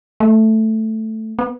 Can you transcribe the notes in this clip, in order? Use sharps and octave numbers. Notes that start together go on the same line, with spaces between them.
A3
B3